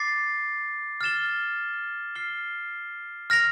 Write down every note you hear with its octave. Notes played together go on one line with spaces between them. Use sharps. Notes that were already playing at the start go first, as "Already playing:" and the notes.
Already playing: D6 A6 C7
F6 A6 E7 G7
F6 C7 G7
F6 A#6 F7